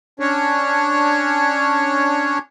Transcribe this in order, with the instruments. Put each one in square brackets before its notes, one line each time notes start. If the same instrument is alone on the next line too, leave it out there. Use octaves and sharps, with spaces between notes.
[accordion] C#4 D4 C#5